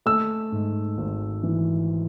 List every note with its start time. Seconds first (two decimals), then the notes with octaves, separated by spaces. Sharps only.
0.06 A3 E6
0.52 G#2
0.97 G#1
1.43 E3